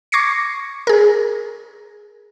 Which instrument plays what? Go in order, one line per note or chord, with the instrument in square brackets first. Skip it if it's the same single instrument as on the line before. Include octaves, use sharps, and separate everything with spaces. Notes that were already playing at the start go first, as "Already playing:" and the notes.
[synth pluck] C#6 D6 G#6 A#6 C7 C#7
G#4 A#4